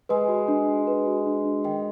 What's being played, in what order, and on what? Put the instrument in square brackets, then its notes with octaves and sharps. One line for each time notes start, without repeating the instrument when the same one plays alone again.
[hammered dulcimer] G#3 [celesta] B4
[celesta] F#4
D4
D4
B4
F#4
D4
D4
[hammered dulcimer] D#3 [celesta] G5